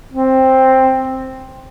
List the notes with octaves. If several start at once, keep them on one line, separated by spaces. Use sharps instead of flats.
C4